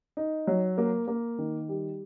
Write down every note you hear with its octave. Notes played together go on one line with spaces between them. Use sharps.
D#4
F#3
A#3
A#3
D#3
G3